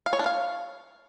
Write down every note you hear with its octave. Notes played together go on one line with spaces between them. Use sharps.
F5
C#5
D4
F5